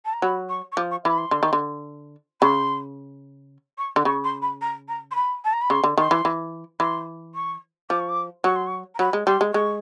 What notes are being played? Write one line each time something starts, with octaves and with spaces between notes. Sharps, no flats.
A5
A#5
F#3 B5
C#6
C#6
F3 D6
C#6
E3 B5
C6
D3
D#3
D3
C#3 C6
C#6
D3
C#3 C#6
C6
B5
A#5
A#5
C6
B5
A5
A#5
B5
C#3 C6
D3
D#3 C6
E3
E3
E3 C6
C#6
F3 D6
C#6
D6
F#3 C#6
C6
C#6
A#5
F#3 B5
G#3
G3 C6
G#3
G#3 C#6